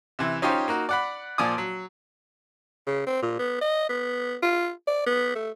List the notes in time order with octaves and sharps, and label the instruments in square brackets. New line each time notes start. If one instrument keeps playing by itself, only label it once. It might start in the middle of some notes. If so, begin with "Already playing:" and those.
[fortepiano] C3 E3
C#4 D#4 F4 G4 C5 C#5
A#3 D#4 F#4
D5 F#5 B5
A#2 F3 D5 G#5 D6 D#6
F#3
[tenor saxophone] C#3
C4
A#2
B3
D#5
B3
F4
D5
B3
A3